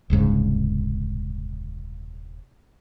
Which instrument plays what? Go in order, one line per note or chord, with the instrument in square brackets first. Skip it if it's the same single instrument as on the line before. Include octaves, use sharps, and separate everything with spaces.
[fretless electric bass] D#1 C2 G#2 C#3